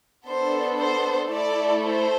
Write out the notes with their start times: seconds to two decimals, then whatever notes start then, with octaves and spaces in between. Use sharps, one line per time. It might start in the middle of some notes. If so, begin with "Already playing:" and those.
0.27 B3 D4 A4 C5
0.80 C5
1.32 A3 E4 A4 D5
1.85 C5